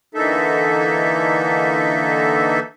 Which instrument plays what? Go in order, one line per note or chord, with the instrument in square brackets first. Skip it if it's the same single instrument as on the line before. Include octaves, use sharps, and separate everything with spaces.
[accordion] D3 E3 A#3 D#4 A4 E5